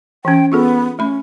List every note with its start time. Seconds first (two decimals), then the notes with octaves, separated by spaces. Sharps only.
0.25 E3 C#4 G5
0.52 B3 F4 G#4 A4
0.99 A3 C#4 B5